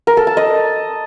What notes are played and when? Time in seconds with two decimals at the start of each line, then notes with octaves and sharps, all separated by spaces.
0.07 A#4
0.17 A4
0.27 A5
0.37 D#5